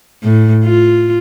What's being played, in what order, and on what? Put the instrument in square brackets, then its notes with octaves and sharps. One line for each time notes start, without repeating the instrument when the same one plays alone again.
[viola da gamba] A2
F4